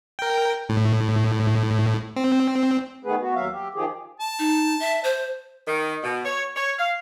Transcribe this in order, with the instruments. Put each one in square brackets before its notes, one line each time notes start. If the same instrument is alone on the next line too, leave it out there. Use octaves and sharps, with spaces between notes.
[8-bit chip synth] A#4 G5
A2
C4
[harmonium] D#3 A3 B3 G#4 B4
B3 F#4
D#2 F#3 E5 F5
G4
D#3 F3 G4 G#4
[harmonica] A5
[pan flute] D#4
E5
C5
[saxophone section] D#3
B2
C#5
C#5
F5